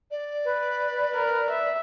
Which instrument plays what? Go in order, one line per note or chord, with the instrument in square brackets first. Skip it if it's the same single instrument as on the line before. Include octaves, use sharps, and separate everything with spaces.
[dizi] D5
[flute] B4
[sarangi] A#4
E5